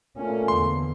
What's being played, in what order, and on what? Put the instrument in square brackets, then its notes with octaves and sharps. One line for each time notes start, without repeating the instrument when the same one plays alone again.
[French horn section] A#2 A3 [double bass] C#4
[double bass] E2 D3 [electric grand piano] C6